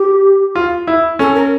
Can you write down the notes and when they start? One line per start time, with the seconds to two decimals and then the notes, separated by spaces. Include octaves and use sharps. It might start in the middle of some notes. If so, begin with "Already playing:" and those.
Already playing: G4
0.55 F4
0.87 E4
1.19 C#4 A4
1.35 A#4